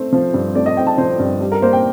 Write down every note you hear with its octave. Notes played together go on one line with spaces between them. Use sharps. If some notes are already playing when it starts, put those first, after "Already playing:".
Already playing: A3 C4 C5
F3
G2
A3 D5
D#5
C4 G5
A5
F3 C5
G2
G3
A#4
A#3 C5
G5